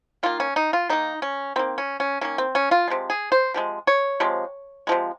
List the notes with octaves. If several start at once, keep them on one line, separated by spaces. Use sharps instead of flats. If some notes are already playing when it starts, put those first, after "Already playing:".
D#3 A#3 F4
C#4
D#4
F4
D#3 A#3 D#4
C#4
D#3 A#3 C4
C#4
C#4
D#3 A#3 C#4
C4
C#4
F4
C3 F3 G#3
G#4
C5
C3 F3 G#3
C#5
C3 F3 G#3
C3 F3 G#3